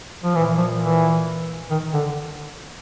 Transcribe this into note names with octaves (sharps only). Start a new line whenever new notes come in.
F3
A#2 E3
F3
E3
D#3
D3